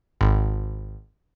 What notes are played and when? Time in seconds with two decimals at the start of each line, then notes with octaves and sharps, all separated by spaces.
0.21 G#1